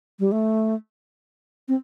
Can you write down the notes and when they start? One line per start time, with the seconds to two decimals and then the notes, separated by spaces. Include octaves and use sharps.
0.19 G3
0.32 A3
1.68 C4